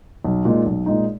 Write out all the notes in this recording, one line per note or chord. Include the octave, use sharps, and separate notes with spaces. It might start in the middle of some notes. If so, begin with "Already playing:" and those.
B1
A#2 G#3 D#4
B1
A#2 G#3 D#4